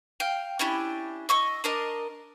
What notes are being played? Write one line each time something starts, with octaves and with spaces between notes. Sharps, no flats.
F5 G5
C#4 D4 E4 G4
D#5 C#6 E6
D4 A#4 D#5